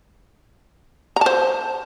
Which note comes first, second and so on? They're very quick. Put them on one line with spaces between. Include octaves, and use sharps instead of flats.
A#5 A5 C5